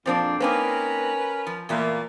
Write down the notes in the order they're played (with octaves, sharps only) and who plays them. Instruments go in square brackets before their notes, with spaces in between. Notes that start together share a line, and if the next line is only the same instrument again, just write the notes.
[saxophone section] F2 C4 [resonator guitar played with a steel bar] A#2 F3 D4
[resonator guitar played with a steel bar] A#3 C4 D#4 [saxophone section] C#4 A#4 B4
[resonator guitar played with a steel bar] F3
[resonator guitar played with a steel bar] E2 A3 E5 [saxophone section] A#2 A#3